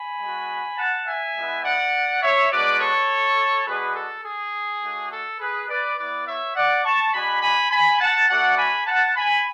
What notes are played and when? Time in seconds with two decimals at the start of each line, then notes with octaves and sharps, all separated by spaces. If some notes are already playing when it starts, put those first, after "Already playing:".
Already playing: G#5 B5
0.20 G#3 B3 F#4
0.78 F#5 A5
1.07 E5 G#5
1.35 G#3 B3 E4
1.64 D5 F#5
2.22 C#5 E5
2.51 G#3 B3 D4 F#4 B4 D5
2.80 A4 C#5
3.67 G#3 D4 F#4 G#4 B4
3.95 A4
4.25 G#4
4.82 A3 D4 F#4
5.11 A4
5.40 G#4 B4
5.68 B4 D5
5.97 B3 E4 B4 D5
6.27 C#5 E5
6.56 D5 F#5
6.84 A5 C#6
7.13 G#3 D4 F#4 G#5 B5
7.42 G#5 B5
7.71 G#5 B5
8.00 F#5 A5
8.29 A3 D4 F#4 D5 F#5
8.57 G#5 B5
8.87 F#5 A5
9.16 G#5 B5